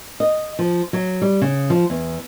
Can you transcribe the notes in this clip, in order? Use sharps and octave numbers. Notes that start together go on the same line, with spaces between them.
D#5
F3
F#3
G3
C#3
F3
E2